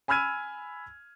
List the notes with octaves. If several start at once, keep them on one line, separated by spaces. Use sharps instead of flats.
G#5 B5 E6 F6 G#6 D#7